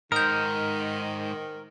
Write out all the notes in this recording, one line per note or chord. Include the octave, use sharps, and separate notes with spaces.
G#2 D#3 A#4 D#6 G6